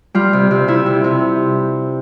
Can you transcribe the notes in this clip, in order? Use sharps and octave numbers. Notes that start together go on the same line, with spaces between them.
G3 F4
C3
C3
C3 E4
C3
C3